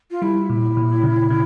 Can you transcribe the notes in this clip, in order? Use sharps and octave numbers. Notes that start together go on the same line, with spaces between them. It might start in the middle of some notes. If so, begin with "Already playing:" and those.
F4
G3 E4
A#2
A#2
C#3
C#3